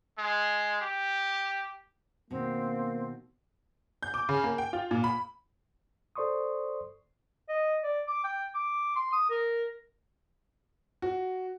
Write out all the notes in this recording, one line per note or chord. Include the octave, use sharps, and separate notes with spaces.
G#3
G4
B2 D#3 A#3 C4
G6
D6
C#3
A#3
G5
F4
A#2
B5
A4 C5 D5 C6 C#6 D#6
D#5
D5
D6
G5
D6
C6
D#6
A#4
F#4